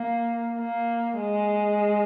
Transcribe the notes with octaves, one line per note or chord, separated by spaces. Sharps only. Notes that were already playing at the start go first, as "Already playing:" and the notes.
Already playing: A#3
A#3
G#3